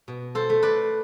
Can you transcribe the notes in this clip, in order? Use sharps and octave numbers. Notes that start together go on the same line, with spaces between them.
B2
A4 C5
A3
B4 D5